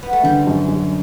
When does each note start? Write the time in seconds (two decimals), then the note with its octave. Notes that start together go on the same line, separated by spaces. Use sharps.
0.03 B3
0.13 A3
0.23 D3 G3
0.47 F#2
0.69 F#2